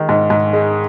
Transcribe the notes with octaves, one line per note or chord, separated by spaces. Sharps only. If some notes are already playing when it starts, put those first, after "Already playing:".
Already playing: D#3 G#3
G#2
G#2
G#3